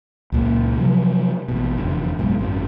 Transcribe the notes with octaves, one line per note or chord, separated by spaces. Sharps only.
C#2 A#2 A#3
C3 F3 F#3
A1 B2
F1 E2 D3
F#1 B1 G#2 B2
G#1 F#2 F#3